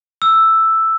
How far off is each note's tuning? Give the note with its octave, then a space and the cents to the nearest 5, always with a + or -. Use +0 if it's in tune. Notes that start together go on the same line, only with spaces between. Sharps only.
E6 +5